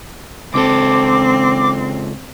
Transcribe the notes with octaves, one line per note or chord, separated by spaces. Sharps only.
C#2 C4 A4 D6